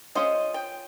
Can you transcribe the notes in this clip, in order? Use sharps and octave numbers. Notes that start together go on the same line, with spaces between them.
C#4 F4 G#4 C5 D#5
G5